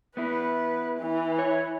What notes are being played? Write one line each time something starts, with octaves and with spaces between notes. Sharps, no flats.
B3 E4 B4
E3
C#5